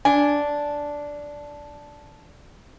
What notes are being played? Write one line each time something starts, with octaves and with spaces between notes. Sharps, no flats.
D4 G#5